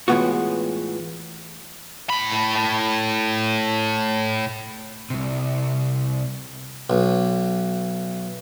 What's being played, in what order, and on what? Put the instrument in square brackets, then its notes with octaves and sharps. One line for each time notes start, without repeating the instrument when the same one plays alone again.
[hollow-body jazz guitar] A2 E3 G#3 B3 F4 F#4
[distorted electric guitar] A2 B5
[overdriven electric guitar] C2 C3
[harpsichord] B1